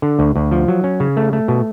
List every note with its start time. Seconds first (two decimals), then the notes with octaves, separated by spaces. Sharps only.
0.02 D3
0.19 D2
0.36 D2
0.51 F3
0.68 F#3
0.84 C#4
1.00 C#3
1.17 A3
1.33 A3
1.48 B2